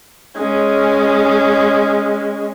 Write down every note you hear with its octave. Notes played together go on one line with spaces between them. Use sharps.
G#3 C#4